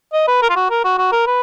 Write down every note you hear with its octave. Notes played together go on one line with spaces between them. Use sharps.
D#5
B4
A#4
F4
F#4
A#4
F#4
F#4
A#4
B4